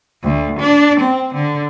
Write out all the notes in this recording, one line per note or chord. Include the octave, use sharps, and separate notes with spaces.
D2
D4
C4
D3